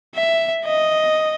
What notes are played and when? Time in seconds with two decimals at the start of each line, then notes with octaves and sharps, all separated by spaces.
0.15 E5
0.65 D#5